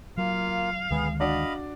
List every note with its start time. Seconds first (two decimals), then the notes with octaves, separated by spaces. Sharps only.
0.18 F#3 A#3 F4 F5
0.91 D2 D#3 G#3 B3 G#4
1.20 D4 F#4 D5 D#5 F5 B5